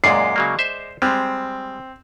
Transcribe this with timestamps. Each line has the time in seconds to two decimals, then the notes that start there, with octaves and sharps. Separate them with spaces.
0.04 F#2 A#2 G#3 D5 C7
0.36 C#3 F#3 A#3
0.59 C5 E5
1.02 G3 G#3 C4